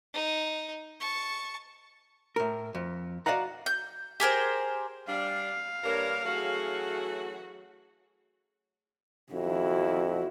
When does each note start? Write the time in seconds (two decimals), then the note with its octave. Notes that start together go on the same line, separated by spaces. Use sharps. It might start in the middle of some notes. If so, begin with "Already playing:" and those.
0.14 D#4
1.00 A5 C#6
2.36 A2 A#4
2.75 F2
3.26 F#4 D5 D#5 F5 F#5 A#5
3.66 G6
4.20 G4 G#4 A#4 C5
5.08 G3 D4 F5
5.84 G2 G3 A#3 D4 A#4 C#5
6.25 E3 F#3 A3 C#4 F#4 G#4
9.33 F2 E4 F#4